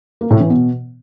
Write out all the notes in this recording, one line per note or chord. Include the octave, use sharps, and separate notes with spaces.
A#3
A2
E3
B2